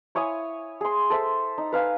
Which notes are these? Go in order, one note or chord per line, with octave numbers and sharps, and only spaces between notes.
E4 C#5 G#5 D#6
G#4 C6
A4 C5 E5
D#4
B4 F5 G#5